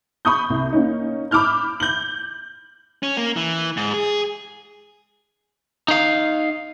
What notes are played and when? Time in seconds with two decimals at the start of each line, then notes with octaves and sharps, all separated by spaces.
0.25 B5 C#6 D#6 G6
0.50 C2
0.72 A#3 C#4 D#4
1.31 B5 D6 E6 F6 G6
1.80 G6 F#7
3.03 C#4
3.17 A#3
3.36 E3
3.77 G#2
3.94 G#4
5.88 D#4 F5